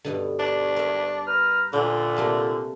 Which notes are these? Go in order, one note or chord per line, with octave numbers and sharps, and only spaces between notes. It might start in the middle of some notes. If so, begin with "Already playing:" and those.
G2 B2 D3
D4
A#4 C#5 E5
B4 A#5 F6
A#2 D3 D4
C3 A3 A#3